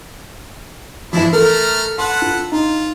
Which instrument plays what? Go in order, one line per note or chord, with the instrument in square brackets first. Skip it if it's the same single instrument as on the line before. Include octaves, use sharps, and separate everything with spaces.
[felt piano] E3 F3 [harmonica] G#3 D4 E4
[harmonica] A3 A#5 F6 [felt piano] A4 A#4
[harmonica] A4 B4 F#5 [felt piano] C6
[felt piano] F4
[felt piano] D#4 [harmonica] F4